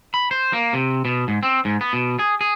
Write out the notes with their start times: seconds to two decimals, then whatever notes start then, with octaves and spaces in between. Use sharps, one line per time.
0.14 B5
0.31 C5
0.53 A#3
0.73 C3
1.05 B2
1.28 G#2
1.43 C4
1.65 G#2
1.81 B3
1.93 B2
2.19 G#4
2.41 G#4